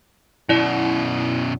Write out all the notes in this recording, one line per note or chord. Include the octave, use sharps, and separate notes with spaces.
F#2 B2 E4 D5